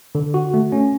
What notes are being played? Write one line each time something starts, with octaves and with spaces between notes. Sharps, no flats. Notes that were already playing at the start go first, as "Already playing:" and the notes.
D3
F#4
A3
C#4